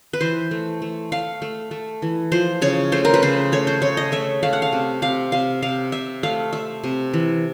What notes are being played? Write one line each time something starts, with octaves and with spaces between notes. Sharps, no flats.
B4
E3 C5
A3
A3
A3 F5
A3
A3
E3
F3 C5
C#3 C#5
A3 C5
A#4
B4
C#3 C5
A3 C#5
C5
A3 C#5
D#5
A3 E5
A3 F5
F#5
F5
C3
C3 F5
C3 F5
C3 F5
C3 E5
A3 F5
A3 E5
C3
E3